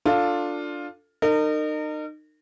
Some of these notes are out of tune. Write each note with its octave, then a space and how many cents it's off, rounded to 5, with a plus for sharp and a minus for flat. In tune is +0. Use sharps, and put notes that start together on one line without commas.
D4 +0 F4 +10 A4 +15
D#4 -30 A#4 -35